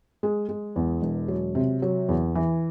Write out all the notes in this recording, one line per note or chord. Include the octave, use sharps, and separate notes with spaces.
G#3
G#3
E2
E1
F#3
C3
F#3
E2
E3